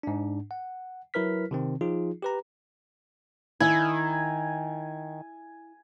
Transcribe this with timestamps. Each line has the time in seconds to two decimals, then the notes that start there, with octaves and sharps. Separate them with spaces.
0.03 G#2 D4
0.51 F#5
1.14 F#3 E4 A#4 B4 F6 B6
1.51 C3 D#3 C4
1.81 F3 D#4 F4 G#4
2.22 G4 B4 A#5
3.60 D#3 E4 G#5